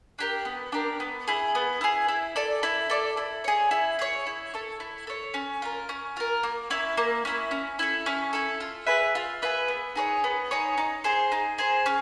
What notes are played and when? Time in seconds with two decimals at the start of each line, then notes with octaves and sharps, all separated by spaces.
0.19 D4 G4 A#4
0.45 B3
0.72 D4 G4 A#4
1.00 B3
1.28 E4 G#4
1.55 B3
1.81 E4 G#4
2.08 E4
2.36 A4 D5
2.63 E4
2.90 A4 D5
3.17 E4
3.44 G#4 C#5
3.71 E4
3.99 G#4 C#5
4.26 E4
4.54 A4 C#5
4.80 E4
5.07 A4 C#5
5.34 C#4
5.62 F4 A#4
5.89 C#4
6.17 F4 A#4
6.43 A#3
6.70 C#4 E4
6.97 A#3
7.25 C#4 E4
7.51 C#4
7.79 E4 A4
8.06 C#4
8.33 E4 A4
8.60 F4
8.87 G#4 B4 E5
9.15 F4
9.42 G#4 B4 E5
9.68 B3
9.95 D#4 G#4 C#5
10.24 B3
10.51 D#4 G#4 C#5
10.78 D#4
11.04 G#4 C5
11.32 D#4
11.58 G#4 C5
11.86 C#4